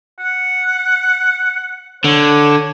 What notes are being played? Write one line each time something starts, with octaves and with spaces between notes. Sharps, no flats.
F#5
D3 C#5